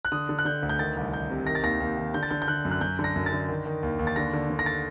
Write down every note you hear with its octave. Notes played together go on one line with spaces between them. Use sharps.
F#6
D3 D#6
D3
F#6
D3 G6
D2
G6
D#3 A6
C2
D#3 G6
C3
D#3 A#6
A6
D#2 A#6
D#2
D#3
D3 G6
A6
D3 G6
G6
D3 F#6
F#2
F#6
F#2 G6
D3
A#6
F#2
A6
D3
D#3
D#3
D#2
D#2
A6
D3 A#6
D3
D3
A#6
A6